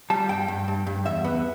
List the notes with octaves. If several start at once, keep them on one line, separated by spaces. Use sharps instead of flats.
G3 A5
G2 G5
G2
G2
G2
E2 E5
B3